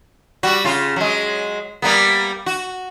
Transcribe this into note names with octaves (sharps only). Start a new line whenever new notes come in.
G3 F#4
C#3 F4
F#3 G#3
G3 A#3 B3
F#4